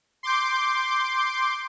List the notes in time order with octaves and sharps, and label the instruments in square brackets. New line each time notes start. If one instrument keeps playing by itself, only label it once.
[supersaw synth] C6 D6 G6